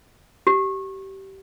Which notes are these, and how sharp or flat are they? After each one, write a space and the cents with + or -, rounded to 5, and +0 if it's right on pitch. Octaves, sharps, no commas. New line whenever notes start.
G4 -25